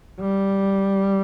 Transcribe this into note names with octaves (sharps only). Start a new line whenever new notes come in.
G3